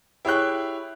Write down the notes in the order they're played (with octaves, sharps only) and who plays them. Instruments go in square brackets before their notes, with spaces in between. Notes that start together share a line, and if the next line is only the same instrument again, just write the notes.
[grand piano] E4 G4 G#4 C#5 G5 F#6